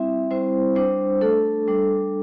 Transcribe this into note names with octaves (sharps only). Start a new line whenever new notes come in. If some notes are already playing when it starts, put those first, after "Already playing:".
Already playing: G3 C4 E4 E5
G3 C4 E4 C5
G3 D4 C5
A3 D4 A4
G3 D4